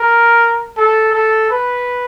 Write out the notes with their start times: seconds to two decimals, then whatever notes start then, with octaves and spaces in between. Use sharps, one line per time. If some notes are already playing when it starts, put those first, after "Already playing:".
Already playing: A#4
0.77 A4
1.13 A4
1.51 B4